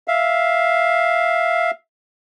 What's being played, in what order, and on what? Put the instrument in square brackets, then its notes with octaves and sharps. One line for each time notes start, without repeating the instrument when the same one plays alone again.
[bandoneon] E5 F5